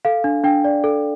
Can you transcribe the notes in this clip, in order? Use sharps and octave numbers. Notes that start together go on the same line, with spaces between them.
A4 F5
D4
D4 G5
D5
A4